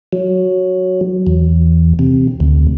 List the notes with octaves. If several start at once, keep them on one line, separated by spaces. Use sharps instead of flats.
F#3
E2
C3
D2